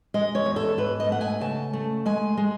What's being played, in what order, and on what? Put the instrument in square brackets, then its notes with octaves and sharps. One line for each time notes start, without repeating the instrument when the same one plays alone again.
[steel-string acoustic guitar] G#3 D#5
C#5
E2
A4
G#2 B4
D#5
A3 F#5
G#5
C#3 A5
A3
G#3 G#5
G#3